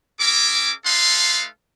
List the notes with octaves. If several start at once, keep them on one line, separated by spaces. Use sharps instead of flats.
C#4 G#4 A#4 E5 D6
A3 D#4 A4 B4 F5 C6